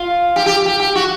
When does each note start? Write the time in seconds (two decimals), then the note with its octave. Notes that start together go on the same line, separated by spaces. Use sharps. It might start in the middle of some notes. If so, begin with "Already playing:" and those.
Already playing: F4
0.36 G4
0.46 G4
0.66 G4
0.80 G4
0.95 F#4